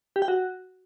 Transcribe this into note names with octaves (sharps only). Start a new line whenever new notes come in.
G4
G5
F#4